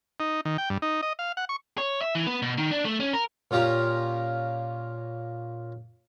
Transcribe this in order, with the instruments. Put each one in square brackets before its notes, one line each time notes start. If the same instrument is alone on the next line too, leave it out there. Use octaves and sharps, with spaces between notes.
[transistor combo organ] D#4
D#3
G5
G2
D#4
D#5
F5
F#5
C#6
[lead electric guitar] C#5
E5
E3
B3
B2
D#3
D4
A3
C#4
A#4
[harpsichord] A#2 C#4 F4 G4 A#5